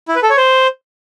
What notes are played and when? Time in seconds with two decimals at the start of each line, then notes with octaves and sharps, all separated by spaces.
0.08 E4
0.16 B4
0.23 A4
0.30 C#5
0.37 C5